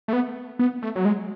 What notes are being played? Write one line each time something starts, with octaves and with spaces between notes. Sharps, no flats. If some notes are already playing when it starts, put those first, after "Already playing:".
A3
B3
B3
A3
F#3
G#3